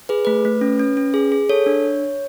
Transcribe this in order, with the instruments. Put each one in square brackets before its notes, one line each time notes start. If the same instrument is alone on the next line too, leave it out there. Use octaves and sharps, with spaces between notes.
[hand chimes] G#4 B4
A3 B4
A3
C#4
C#4
C#4
G#4
G#4
A4 C#5
D4